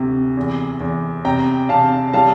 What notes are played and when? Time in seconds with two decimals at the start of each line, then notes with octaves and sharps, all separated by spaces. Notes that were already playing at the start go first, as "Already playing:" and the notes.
Already playing: D2 C3
0.37 E2
0.80 E2
1.24 C3 G5 A#5
1.69 C3 F5 A5
2.13 G3 F5 A5